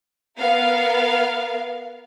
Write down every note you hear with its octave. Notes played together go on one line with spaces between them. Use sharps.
B3 A#4 F5